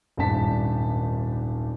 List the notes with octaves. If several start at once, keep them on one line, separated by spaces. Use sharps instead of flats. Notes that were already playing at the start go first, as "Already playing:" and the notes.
D#1 G#1 G2 D4 A5 B6